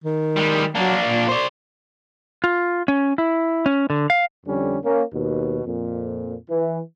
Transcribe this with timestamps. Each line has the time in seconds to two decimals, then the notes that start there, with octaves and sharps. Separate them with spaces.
0.04 D#3
0.37 G3 G#3
0.75 F#3 A#3 D4
1.06 A#2
1.29 C5 D5
2.44 F4
2.88 C#4
3.18 E4
3.66 C#4
3.90 D3
4.10 F5
4.46 F2 D3 G3 C#4
4.84 A#3 C#4
5.14 D#2 B2
5.65 F2 A#2
6.50 E3